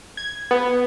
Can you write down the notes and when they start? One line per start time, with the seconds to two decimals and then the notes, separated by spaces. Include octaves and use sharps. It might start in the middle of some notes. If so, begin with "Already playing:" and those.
0.17 G#6
0.51 B3